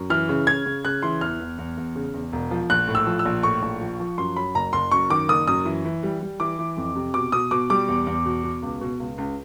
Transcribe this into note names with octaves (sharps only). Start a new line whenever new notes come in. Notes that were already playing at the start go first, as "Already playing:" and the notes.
Already playing: F#2
E3 F6
C#3
C#3 G#6
C#3
C#3 F#6
E3 C6
E2 F6
E2
E2
E2
C#3
E2
E1
F3
A#1 F#6
A2
E6
F3
E6
A#1
A2 C#6
A#1
F3
F3
F#2 C6
F#3 B5
F#1 A#5
F#1 C6
F#2 C#6
D#3 D6
F#1 D#6
F#2 D#6
E3
E3
G3
G3
E3 D6
E3
F2
C3
B2 D6
B2 D#6
B2 D6
G3 D6
E2
E2
B2
B2
C#2
B2
C#2
C#2